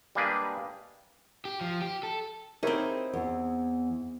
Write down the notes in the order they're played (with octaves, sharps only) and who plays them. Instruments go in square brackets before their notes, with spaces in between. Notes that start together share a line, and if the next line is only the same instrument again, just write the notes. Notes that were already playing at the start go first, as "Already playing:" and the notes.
[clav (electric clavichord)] G3 G#3 A#3 D4 G#4 B4
[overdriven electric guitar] G4
F3
G4
A4
[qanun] C4 G#4 [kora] D#4 E4 [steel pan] G4 A#4 C#5
[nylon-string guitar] E2